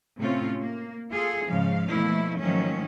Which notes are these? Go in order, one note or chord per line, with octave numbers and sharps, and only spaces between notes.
A2 C3 A3 C4 C#4 F4
A#3
F4 G#4 A4
G#2 C#3 F3 F5
B2 F3 A3 A#3 E4
G#2 D#3 F3 F#3 A3 C#4